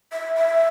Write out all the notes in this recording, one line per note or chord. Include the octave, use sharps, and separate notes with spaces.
E5
E5